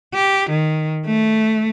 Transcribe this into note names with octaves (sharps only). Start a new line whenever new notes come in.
G4
D#3
A3